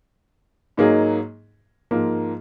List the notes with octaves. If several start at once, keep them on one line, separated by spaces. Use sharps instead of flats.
G#2 F#3 A#3 D#4 G#4
G#2 F3 A#3